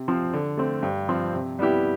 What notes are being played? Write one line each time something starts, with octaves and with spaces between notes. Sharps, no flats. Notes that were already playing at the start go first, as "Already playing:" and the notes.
Already playing: C3
F3 C4
D3
A3 C4
G2
F3 C4
C3
G3 B3 E4 G4